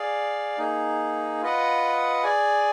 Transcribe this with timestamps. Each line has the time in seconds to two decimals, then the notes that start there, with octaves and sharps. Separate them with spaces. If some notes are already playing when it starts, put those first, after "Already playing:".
Already playing: G#4 D5 F5
0.58 A#3 D#4 G#4
1.42 F4 B4 D#5 F#5
2.24 G#4 D5 G#5